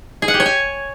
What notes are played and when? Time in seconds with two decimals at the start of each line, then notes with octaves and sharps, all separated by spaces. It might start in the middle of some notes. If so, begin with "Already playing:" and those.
0.22 G#4
0.28 F#5
0.34 G4
0.40 C#5
0.46 G#5